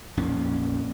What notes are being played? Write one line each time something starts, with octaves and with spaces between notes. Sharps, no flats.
A#1 F2 A#3 C#4